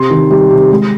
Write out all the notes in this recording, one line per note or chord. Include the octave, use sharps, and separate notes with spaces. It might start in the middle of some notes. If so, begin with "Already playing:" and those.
Already playing: C3 C6
D#3
G3
C3
G#3